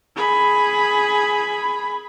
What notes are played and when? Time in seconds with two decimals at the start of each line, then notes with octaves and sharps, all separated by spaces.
0.17 G#4 B5